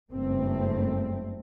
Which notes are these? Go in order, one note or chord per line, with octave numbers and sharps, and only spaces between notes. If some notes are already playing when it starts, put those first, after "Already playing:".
F#1 G2 A3 C4